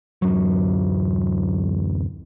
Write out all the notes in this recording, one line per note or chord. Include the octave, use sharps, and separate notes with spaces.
D1 F#2 F#3